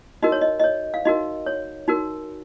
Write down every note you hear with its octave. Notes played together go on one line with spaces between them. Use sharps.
D#4 F#4 A#4 D#5
C#5
D#5
D#5
C#5
F5
D#4 F#4 A#4 D#5
C#5
D#4 F#4 A#4